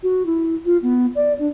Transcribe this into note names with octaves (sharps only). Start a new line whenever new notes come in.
F#4
E4
F4
B3
D5
D4